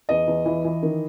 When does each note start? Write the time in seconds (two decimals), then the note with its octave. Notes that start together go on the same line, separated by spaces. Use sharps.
0.09 E2 D#5
0.28 E2
0.46 E3
0.65 E3
0.83 D#3